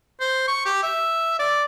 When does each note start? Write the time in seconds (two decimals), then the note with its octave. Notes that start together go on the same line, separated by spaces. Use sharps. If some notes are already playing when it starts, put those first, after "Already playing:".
0.20 C5
0.48 C#6
0.66 G4
0.83 E5
1.39 D5